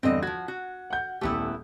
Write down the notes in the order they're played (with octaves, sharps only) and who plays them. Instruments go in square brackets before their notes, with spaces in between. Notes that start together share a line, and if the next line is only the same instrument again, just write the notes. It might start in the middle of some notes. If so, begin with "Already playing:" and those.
[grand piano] E2 G2 D3 [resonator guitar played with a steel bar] C4 D#5
[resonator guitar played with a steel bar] F3 F#4 [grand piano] G#6
[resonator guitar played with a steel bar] F#4
[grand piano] F#5 G6
[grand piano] D#1 G4 [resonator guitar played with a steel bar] A3 B3 E4